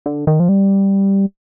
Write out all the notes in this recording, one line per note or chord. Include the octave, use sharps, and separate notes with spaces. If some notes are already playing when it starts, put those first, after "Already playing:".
D3
D#3
F3
G3